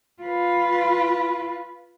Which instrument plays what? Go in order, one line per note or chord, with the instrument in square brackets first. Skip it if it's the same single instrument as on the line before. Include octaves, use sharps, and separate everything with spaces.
[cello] F4 B4